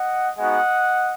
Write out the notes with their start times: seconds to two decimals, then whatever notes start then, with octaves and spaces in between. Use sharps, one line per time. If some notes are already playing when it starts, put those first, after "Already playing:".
Already playing: D#5 F#5
0.37 G#3 B3 D#4 F#4 D#5 F#5